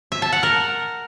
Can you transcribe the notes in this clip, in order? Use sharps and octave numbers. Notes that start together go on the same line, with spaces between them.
E5
A5
F#5
A#4